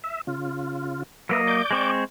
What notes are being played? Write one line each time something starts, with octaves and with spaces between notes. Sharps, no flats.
E5
C#3 F4
F#3 A#3 A#4 B4 D#5 E5
D5 D6 G6
G#3 C4 C#6